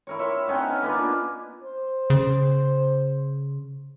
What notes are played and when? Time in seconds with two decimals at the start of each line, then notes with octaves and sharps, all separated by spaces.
0.07 E4 A#4 C#5
0.19 C#5 E5 B5 C6
0.47 C4 C#4 D#4 F#5
0.68 B4
0.83 A#3 B3 C#4 F4
0.97 D4
1.63 C5
2.10 C#3